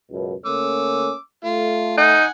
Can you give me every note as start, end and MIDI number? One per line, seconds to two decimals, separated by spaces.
0.11 0.34 37
0.11 0.34 42
0.11 0.34 47
0.45 1.13 57
0.45 1.13 58
0.45 1.13 61
0.45 1.19 86
0.45 1.19 88
1.45 2.17 57
1.45 1.96 65
1.98 2.25 63
1.98 2.30 78
1.98 2.30 80